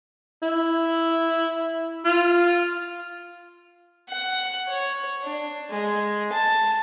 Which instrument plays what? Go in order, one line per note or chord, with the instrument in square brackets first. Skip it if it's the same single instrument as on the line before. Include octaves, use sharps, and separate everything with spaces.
[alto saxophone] E4
F4
[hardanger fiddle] F#5
C#5
D4
G#3
A5